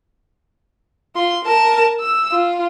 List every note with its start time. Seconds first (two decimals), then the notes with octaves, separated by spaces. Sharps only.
1.16 F4 C6
1.45 A#4 A5
2.00 E6
2.31 F4